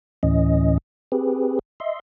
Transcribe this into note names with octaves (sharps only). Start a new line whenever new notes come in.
D2 A2 E3 C#4 D#5
C4 G4 G#4 B4
D#5 E5 C6